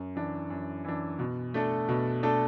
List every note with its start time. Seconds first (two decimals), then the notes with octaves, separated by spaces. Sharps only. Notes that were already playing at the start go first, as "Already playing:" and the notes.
Already playing: F#2
0.15 E3 D4
0.50 F#2
0.84 E3 D4
1.19 B2
1.54 A3 D4 A4
1.88 B2
2.23 A3 D4 A4